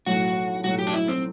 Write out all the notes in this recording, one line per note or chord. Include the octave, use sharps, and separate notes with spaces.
B1 A2 F#3 A3 F#4
B1 A2 F#3 A3 F#4
G4
D4
E4
C4